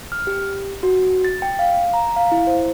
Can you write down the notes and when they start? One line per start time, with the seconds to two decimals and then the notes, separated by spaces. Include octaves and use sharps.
0.12 F6
0.27 G4
0.83 F#4
1.25 A6
1.42 G5
1.59 F5
1.94 A#5
2.16 F5
2.32 E4
2.47 C5